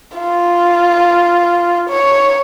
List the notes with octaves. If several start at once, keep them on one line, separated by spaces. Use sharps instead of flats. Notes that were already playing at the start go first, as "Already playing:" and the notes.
F4
C#5